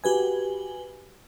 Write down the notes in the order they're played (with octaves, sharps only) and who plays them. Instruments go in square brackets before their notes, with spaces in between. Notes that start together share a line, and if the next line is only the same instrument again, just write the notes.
[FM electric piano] F#4 G4 B4 G#5